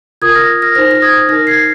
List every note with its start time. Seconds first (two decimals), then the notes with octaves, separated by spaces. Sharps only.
0.22 F4 A#4 D#6 G#6
0.35 F6 A#6
0.62 F6 A#6
0.75 D#4 C5 F6 A#6
0.91 A#6
1.02 D#6 G#6
1.29 D#4 F6 A#6
1.32 A#4
1.47 G#6 C7